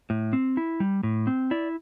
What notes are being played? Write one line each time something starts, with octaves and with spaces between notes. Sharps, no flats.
A2
C4
E4
G3
A2
C4
E4 D5